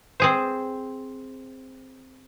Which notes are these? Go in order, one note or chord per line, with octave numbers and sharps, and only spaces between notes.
C4 G#4 C5